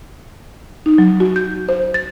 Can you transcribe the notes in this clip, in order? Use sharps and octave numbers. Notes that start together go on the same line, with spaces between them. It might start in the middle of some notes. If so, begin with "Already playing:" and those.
D#4
F#3
F#4
G6
C5
A6